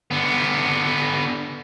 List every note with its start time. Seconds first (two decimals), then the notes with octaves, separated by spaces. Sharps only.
0.11 D3 B3